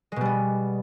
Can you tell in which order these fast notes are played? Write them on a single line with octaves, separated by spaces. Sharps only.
G#3 B2 G3 B3